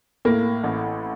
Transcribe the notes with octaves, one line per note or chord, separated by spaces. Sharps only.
A2 A#3
A1